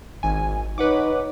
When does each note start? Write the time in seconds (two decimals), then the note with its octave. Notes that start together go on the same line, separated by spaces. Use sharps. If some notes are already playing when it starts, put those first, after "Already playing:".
0.23 G#1 G#5
0.78 D#4 B4 C#5 F#5 D6